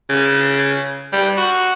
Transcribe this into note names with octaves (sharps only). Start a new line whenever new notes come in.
C#3
G3
F#4